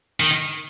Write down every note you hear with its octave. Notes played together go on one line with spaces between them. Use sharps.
D#3